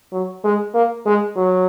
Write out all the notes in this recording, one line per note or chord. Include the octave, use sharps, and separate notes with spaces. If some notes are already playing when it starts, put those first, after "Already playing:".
F#3
G#3
A#3
G#3
F#3